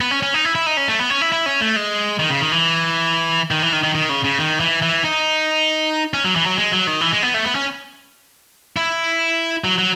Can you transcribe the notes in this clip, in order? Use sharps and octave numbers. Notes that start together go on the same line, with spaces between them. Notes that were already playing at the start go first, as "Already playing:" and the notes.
B3
C#4
C#4
D#4
E4
E4
D#4
C#4
A3
B3
C#4
E4
E4
C#4
A3
G#3
D#3
C#3
D#3
E3
D#3
E3
D#3
D#3
D#3
C#3
C#3
D#3
E3
E3
D#4
C#4
F#3
E3
F#3
G#3
F#3
D#3
E3
G#3
B3
A3
B3
C#4
E4
F#3
F#3